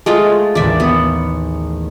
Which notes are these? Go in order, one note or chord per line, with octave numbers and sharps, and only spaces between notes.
G#3 A3 F4
A1 D#2 D5 E5
B3